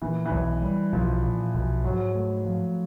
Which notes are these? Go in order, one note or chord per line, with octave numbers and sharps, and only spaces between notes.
A#2 E3
E3
B1
G3
B1 F3
A#2
B1
G#2 F#3
A3
F3